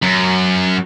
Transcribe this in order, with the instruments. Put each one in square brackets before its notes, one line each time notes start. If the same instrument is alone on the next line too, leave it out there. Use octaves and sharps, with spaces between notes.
[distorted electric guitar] F#2